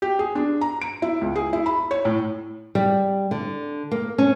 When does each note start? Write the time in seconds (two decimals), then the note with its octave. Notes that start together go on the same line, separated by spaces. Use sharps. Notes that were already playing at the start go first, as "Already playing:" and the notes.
0.02 G4
0.19 G#4
0.35 D4
0.61 A#5
0.82 D7
1.02 E4
1.21 C#2
1.36 G#4
1.53 E4
1.66 B5
1.91 C#5
2.05 A2
2.75 G3
3.31 D3
3.91 A#3
4.18 C#4